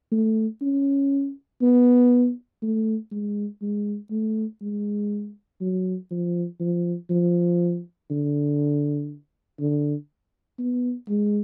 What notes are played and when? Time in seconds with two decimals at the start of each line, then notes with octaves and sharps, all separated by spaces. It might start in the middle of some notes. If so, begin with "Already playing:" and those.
0.12 A3
0.61 C#4
1.62 B3
2.62 A3
3.12 G#3
3.62 G#3
4.11 A3
4.62 G#3
5.61 F#3
6.11 F3
6.60 F3
7.10 F3
8.11 D3
9.60 D3
10.59 B3
11.09 G#3